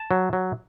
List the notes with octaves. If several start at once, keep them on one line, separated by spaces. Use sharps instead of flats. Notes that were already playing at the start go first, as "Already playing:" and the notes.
Already playing: A5
F#3
F#3